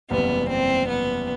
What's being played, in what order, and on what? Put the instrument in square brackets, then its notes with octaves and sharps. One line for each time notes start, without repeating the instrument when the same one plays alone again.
[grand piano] F#1 E2 C3 G3 [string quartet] B3
[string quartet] C4
B3